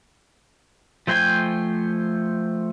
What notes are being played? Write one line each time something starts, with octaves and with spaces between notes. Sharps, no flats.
F3 A3 C5 G5 G#5